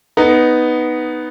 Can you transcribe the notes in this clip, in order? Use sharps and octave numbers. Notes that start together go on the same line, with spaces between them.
B3 D#4